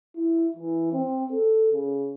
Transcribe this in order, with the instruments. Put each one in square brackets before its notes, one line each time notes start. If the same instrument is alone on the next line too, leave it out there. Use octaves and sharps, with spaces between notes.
[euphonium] E4
E3
C4
A4
C#3